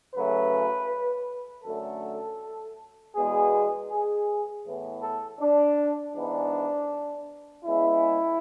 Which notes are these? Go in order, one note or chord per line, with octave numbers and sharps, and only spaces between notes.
F#2 C#3 F#3 A3 B4
F#2 D3 A3 A4
E2 B2 G#3 B3 G#4
G#4
A2 E3 B3
A4
D4
G#2 E3 B3 D4
C#3 G#3 B3 E4